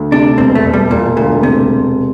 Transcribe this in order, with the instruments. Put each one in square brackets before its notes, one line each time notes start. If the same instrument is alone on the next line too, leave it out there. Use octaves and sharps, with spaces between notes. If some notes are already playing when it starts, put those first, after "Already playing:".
Already playing: [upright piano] D2
[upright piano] C3 [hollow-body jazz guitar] D4
[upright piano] E1 [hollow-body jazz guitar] C4
[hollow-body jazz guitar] A3
[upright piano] E1
[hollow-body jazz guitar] G3
[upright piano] E1 [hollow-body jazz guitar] A#2
[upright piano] D2 [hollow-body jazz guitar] A#2
[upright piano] E1 [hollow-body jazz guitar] C3